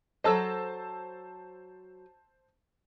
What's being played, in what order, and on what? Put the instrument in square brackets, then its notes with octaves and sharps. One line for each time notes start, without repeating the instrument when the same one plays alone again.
[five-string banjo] F#3 A4 D#5 [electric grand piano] C5 A5 E6